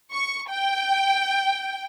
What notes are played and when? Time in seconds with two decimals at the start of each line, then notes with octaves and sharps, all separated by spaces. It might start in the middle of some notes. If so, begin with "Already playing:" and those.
0.13 C#6
0.50 G5